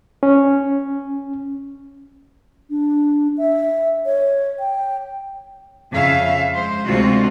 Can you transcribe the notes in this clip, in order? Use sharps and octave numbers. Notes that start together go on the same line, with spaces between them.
C#4
D4
E5
C#5
G5
F2 C#3 E5 F5
G#3 C5
D2 C3 G#3 C4 F4 F#4